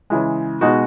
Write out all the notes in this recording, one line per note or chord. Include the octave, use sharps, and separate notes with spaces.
C#3 E3 G#3
B2 G#3 D#4 F#4